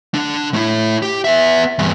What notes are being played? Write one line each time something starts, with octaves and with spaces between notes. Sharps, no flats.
D3 D4
A2 E4
G4
B3 E5
E2 G2